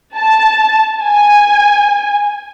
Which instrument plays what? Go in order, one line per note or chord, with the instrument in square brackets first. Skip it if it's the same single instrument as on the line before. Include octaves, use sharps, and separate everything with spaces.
[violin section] A5
G#5